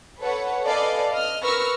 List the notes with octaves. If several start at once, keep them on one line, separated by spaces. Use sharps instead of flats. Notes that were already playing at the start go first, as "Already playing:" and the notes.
A4 B4 C#5 F#5
A4 B4 D5 D#5 F5 G#5
D#5 F6
A#4 B4 C#6 E6 F6 A#6